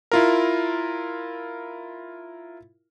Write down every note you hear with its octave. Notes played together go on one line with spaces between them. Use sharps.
E4 F4 A#4